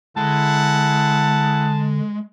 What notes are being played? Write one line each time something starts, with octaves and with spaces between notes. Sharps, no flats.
D3 G#3 E4 F#5 A5